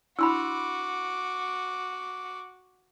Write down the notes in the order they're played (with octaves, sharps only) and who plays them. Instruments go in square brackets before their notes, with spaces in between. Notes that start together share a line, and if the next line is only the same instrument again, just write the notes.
[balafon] D4 E4 [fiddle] F#4 D6 [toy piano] B5 C6 E6